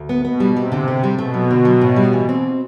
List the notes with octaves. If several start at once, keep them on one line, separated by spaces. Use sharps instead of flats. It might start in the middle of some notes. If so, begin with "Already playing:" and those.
Already playing: D2
B3
B2 B3
G3
C3 G3
D3
D3
G3
B2 A3
F#3
D3
F#3
A2
G3
E3
C4